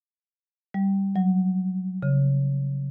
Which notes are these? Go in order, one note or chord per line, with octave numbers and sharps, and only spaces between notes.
G3
F#3
C#3